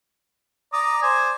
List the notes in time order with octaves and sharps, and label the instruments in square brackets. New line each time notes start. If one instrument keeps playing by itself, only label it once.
[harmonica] D5 A#5 [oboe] D#6
[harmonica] C5 D5 [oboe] G#5